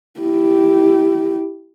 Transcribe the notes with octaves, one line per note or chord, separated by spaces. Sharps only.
E4 G4